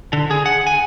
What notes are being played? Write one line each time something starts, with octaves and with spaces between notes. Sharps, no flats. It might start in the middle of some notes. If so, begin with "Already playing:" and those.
D3
G#4
F#5
G#5